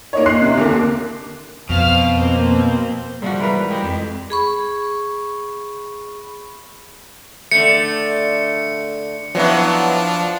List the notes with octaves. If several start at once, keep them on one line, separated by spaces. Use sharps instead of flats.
A#3 D#4 C#5
C6 F#6 C7
C3
D#2 D3 A#3
F2 B2 C5 F5 F6
A#3 C4 C5
G#2 F3 G3 F#4
E3 A#4 B4
G#3 G4
F2
G#4 B5 C#6
D3 A3 C#7
F3 F#3 B3 D4 E4